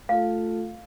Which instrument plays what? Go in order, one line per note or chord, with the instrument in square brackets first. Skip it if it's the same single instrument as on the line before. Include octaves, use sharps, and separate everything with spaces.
[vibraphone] A3 F4 A4 [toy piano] F5